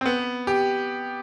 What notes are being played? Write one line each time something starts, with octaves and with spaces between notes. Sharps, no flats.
C4
B3
G4